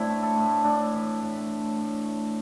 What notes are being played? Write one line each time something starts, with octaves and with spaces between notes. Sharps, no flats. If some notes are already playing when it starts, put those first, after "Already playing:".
Already playing: A2 C4 D4 E4
A3
A4
A2
A2 D4
E3
A2
A2
A2
A3